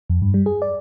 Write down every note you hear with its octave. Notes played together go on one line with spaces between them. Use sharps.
F2
G2
G3
G#4
D5